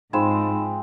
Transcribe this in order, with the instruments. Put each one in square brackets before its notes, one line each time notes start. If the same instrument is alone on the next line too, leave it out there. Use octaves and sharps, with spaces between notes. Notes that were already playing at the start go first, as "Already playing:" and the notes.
[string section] G#2 [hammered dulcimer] F3 G#3 C4 [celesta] D#4 B5 E7